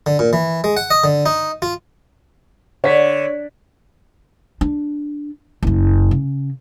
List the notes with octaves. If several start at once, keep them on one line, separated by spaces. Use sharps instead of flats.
D3
A#2
E3
G#3
F#5
D#5
D3
D#4
F4
D3 C#5 B6
D4
F#1 F#2
C#3